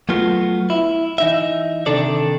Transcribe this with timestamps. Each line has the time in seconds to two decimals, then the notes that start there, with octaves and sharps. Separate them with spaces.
0.09 F#3 A3 B3 F4 F#4
0.70 E4
1.18 E3 D#4 E5
1.86 C3 D#3 D4 A4 D5